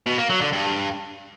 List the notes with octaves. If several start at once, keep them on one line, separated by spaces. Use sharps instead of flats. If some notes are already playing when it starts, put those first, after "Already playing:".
B2
A#3
F#3
D3
G2